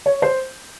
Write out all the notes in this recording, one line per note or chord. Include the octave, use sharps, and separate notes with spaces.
C#5
C5